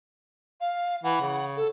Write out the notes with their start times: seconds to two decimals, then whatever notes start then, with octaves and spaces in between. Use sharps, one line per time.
0.61 F5
1.04 E3 F#5
1.21 C#3
1.57 A4